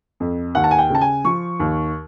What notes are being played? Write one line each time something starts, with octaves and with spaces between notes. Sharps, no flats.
F2
D#2 F#5
A5
G#5
G5
C#3 A5
G#5
F3 C#6
D#2